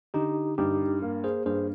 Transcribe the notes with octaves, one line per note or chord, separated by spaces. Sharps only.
D3 D#4 G4
G2 D#4 G4
A#3
G#4 C5
G2 G#4 C5